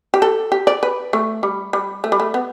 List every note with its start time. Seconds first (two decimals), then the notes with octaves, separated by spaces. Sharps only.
0.14 G4
0.22 A4
0.52 G4
0.67 D5
0.83 B4
1.13 A3
1.43 G3
1.73 G3
2.04 A3
2.12 G3
2.20 A3
2.34 B3